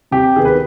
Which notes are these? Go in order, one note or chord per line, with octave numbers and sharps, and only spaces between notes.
C3 G4
D#3 B3 G#4
B4